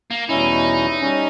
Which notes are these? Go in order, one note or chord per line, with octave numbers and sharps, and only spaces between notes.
A#3
E2 B2 G3 C#4 D#4 E4
G3 C#4